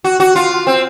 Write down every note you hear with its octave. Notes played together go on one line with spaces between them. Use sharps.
F#4
F#4
F4
C4